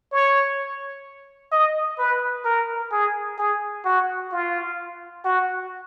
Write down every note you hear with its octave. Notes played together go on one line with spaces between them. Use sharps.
C#5
D#5
B4
A#4
G#4
G#4
F#4
F4
F#4